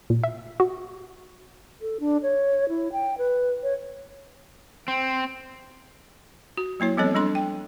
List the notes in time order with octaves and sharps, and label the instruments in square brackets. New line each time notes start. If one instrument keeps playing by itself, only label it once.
[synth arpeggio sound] A#2
E5
F#4
[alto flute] A4
D4
C#5
E4
G5
B4
C#5
[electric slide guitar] C4
[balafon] F#4
F#3 A#3 E4 C#5
F3 G3 B3 C4 A4 C#5
G3 D4 A4 C6
G5